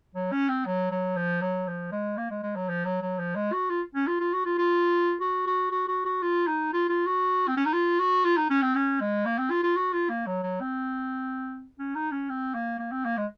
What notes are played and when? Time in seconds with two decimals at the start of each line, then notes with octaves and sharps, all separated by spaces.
0.15 F#3
0.32 C#4
0.48 C4
0.65 F#3
0.91 F#3
1.16 F3
1.41 F#3
1.67 F3
1.92 G#3
2.17 A#3
2.30 G#3
2.42 G#3
2.55 F#3
2.68 F3
2.85 F#3
3.01 F#3
3.18 F3
3.35 G#3
3.52 F#4
3.70 F4
3.95 C#4
4.07 F4
4.20 F4
4.33 F#4
4.45 F4
4.58 F4
5.20 F#4
5.47 F#4
5.71 F#4
5.88 F#4
6.05 F#4
6.22 F4
6.47 D#4
6.73 F4
6.89 F4
7.06 F#4
7.47 C4
7.57 C#4
7.65 D#4
7.73 F4
7.99 F#4
8.24 F4
8.37 D#4
8.50 C#4
8.62 C4
8.75 C#4
9.00 G#3
9.25 A#3
9.38 C4
9.50 F4
9.63 F4
9.76 F#4
9.93 F4
10.09 A#3
10.26 F#3
10.43 F#3
10.61 C4
11.78 C#4
11.95 D#4
12.11 C#4
12.29 C4
12.54 A#3
12.79 A#3
12.91 C4
13.05 A#3
13.17 G#3